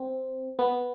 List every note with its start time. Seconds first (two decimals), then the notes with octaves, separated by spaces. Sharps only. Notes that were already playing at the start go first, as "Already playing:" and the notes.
Already playing: C4
0.59 B3